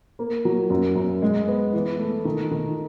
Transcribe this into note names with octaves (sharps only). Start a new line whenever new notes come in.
A#3
F#3
F#2
F#2
G#3
B3
E3
A3
D#3
D#3